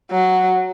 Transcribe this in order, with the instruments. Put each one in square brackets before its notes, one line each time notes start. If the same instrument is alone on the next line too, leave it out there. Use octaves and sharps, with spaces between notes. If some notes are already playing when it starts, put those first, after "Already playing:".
[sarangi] F#3